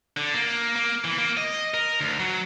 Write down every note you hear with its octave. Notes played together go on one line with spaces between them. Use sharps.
D3
A#3
A#3
E3
A#3
D#5
A#4
D2
F#3